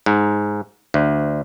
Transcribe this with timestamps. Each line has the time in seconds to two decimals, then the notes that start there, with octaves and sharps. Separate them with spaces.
0.06 G#2
0.94 D2